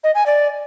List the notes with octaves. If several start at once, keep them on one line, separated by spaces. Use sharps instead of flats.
D#5
G#5
D5